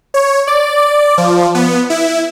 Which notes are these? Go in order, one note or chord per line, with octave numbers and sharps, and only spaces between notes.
C#5
D5
D5
F3
B3
E4